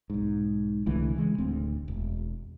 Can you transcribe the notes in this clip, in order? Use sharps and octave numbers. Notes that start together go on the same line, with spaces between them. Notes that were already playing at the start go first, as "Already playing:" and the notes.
B1 G#2
C2 D3 E3 A3
C#3 E3 G#3
D1 D2 C4
E1